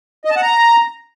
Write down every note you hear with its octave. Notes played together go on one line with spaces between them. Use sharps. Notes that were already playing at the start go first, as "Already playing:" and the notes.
D#5
A5
F#5
A#5